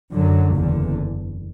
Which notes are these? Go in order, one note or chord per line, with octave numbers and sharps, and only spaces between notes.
F#2 D3 F#3
F#1 E2 D3